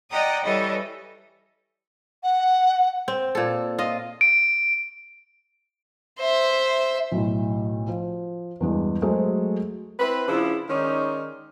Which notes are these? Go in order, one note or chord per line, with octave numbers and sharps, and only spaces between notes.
D5 D#5 F#5 G5 A#5 D#6
E3 G3 E4 A4 C#5 D#5
F#5
C4
A#2 A4
F4 D#5
D7
C5 E5
B1 A2
F3
E2 G2 G#3
F#3 G#3 A3 G#4 A4 C5
C4 E4 B4
C#3 F3 D4 E4
D#3 G#3 C#4 D#4 D5